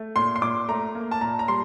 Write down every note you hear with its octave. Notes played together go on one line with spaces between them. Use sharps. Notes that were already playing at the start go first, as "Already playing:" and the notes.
Already playing: A3
A#2 C6
C6
A#2 D6
A3 A#5
A#3
A5
A#2 A#5
A#5
G3 C6